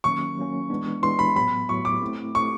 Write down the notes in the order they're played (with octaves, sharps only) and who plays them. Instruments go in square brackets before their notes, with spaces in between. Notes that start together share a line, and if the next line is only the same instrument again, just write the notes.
[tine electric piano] D#3 F#3 A#3 C#4 [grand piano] C#6
[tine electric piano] D#3 F#3 A#3 C#4
E3 G#3 B3 D4
[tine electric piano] E3 G#3 B3 D4 [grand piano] C6
[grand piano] B5
[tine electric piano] A2 F#3 B3 [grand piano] B5
[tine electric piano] A2 F#3 B3 [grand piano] C#6
[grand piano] D6
[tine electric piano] A3 C4 E4
[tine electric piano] A3 C4 E4 [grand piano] C#6